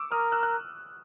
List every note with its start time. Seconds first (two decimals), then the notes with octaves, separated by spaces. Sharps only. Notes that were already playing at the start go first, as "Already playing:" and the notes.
Already playing: C#6 D6 E6
0.12 A#4 D#6 F6
0.32 E6 F#6
0.43 F#6